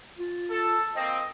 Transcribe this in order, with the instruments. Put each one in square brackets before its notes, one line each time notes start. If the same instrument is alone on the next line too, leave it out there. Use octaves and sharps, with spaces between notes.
[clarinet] F4
[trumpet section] A4
[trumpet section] A#3 C4 [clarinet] D#5